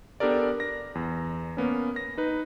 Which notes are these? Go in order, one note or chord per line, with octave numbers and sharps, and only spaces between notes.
B3 D4 G4 A4 A#4 D5
A#6
E2
A#3 B3 C#4
A#6
D#4 B4